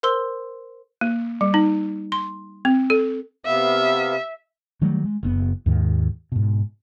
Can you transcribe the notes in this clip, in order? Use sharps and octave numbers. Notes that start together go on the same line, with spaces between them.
A#4 C5 C6 E6 G7
A#3
G3
D#4
C6
C4
A4
C3 B3 E5 F5
D#3 F#3 G3 A3
G#3
F#1 C3 B3
D#2 G#2 D#3
G#2 B2